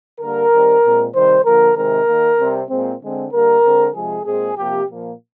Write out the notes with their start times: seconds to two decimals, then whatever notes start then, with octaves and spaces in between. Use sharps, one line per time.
0.20 D3 G3 A#3 A#4
0.52 D#3 G3 C4
0.83 A#2 G#3 C4
1.14 C3 D#3 G3 C5
1.45 D3 F3 A#3 A#4
1.76 C3 D#3 G#3 C4 A#4
2.08 D#3 A#3
2.39 C3 G3 C4
2.70 A#2 G#3 C4
3.01 D3 G#3 C4
3.32 D3 G3 A#3 A#4
3.64 D3 G#3 C4
3.95 C3 F3 G#3 G#4
4.26 A#2 G#3 C4 G#4
4.57 C3 F3 A#3 G4
4.88 A#2 F3 A#3